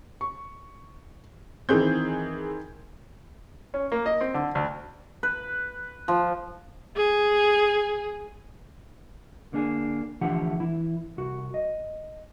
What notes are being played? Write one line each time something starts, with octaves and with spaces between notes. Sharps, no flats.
C#6
D#3 E3 C4 G#4 G6
C#4
A#3
D#5
C4
D3
D2
B4
F3
G#4
D3 A#3 D4 G#4
D3 E3 F3 A3 G4 F#5
E3 E4
C2 F#4
D#5